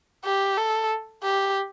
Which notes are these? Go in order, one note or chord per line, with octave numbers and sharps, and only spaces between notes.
G4
A4
G4